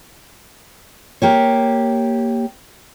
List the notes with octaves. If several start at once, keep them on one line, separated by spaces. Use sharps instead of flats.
A#3 G4 C#5